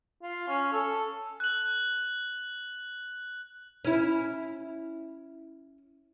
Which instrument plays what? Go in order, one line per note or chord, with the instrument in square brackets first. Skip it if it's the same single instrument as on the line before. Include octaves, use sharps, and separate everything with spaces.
[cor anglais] F4
C#4
A4
[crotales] F#6 F#7
[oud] C#4 E4